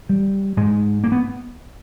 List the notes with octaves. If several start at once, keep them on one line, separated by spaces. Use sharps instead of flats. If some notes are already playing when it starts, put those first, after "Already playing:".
G3
G#2 G#3
A#3
B3